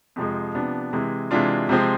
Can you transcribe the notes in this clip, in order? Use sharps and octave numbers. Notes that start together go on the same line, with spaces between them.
F2 C3 F3 G#3
C3 F3 B3 D4
C3 E3 G#3
C3 E3 G#3 D4 F4
C3 F3 G#3 C4 F4